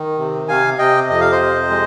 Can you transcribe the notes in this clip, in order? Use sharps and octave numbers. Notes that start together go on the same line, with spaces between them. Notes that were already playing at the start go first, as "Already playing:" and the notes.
Already playing: D#3
C3
C3 F5 G#5
C3 D#5 G5
F2 D#5
F5
C5 D#5
C3
G#3